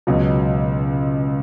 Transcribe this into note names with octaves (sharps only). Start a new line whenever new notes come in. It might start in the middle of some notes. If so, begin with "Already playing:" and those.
C#2 B2 F#3